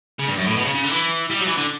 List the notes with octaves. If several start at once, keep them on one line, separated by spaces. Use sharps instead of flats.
C#3
G2
F#2
A2
B2
C#3
C#3
D3
E3
G3
F#3
E3
D3